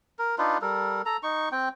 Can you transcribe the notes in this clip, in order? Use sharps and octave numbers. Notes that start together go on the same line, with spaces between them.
A#4
D4 D#4 F4 B4
G3 A4 A#4
A4 A#5
D#4 C#6
C4 G5